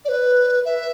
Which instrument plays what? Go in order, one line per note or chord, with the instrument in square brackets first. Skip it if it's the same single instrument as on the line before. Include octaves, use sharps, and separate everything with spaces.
[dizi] D5
B4
E5